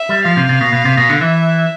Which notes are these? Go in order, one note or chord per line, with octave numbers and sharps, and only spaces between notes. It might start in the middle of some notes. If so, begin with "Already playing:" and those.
Already playing: E5
G3
F3 F5
C3
C3
B2
B2
C3
B2
D3
E3 E5